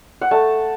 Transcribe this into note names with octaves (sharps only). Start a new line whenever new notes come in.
F#5
A3 A5